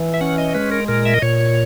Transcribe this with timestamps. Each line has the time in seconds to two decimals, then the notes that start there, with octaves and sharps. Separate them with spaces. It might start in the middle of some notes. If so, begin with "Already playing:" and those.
Already playing: E3
0.14 E5
0.21 C#4 F#5
0.38 D#5
0.55 G#3 B4
0.72 A#4
0.88 A#2 A#4
1.05 E5
1.14 D#5
1.22 A#2 C#5